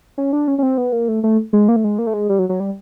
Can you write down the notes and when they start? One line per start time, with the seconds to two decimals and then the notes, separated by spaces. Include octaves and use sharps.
0.18 C#4
0.33 D4
0.48 C#4
0.58 C#4
0.63 C4
0.78 B3
0.92 A#3
1.08 A3
1.23 A3
1.53 G#3
1.68 A#3
1.76 A3
1.84 G#3
1.99 A#3
2.07 A3
2.14 G#3
2.29 G3
2.39 F#3
2.49 F#3
2.60 G3